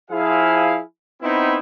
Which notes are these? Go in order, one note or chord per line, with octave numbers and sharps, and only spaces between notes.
F3 E4 G#4 F5
B3 C4 D#4 E4